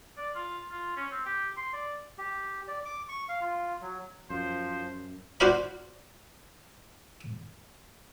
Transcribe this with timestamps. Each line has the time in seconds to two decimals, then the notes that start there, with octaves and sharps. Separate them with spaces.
0.17 D5
0.35 F4
0.71 F4
0.96 C#4
1.11 C4
1.26 G4
1.57 C6
1.73 D5
2.18 G4
2.68 D5
2.85 D6
3.09 C#6
3.29 F5
3.41 F4
3.81 F#3
4.30 F#2 F3 C5
5.40 F#4 C5 D5 F5 B5